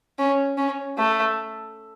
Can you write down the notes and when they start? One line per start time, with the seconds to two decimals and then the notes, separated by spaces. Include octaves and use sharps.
0.18 C#4
0.57 C#4
0.98 A3